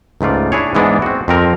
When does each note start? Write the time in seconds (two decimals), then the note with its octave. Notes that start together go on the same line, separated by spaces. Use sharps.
0.21 C#2 G#2 A3 F4 D5
0.52 D4 E4 G#4 C#5
0.75 G#2 E3 G#3 B3 D4 E4
1.02 C4 F#4
1.28 F2 C4 A#4